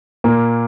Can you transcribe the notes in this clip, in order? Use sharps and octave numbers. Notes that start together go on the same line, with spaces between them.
A#2 A#3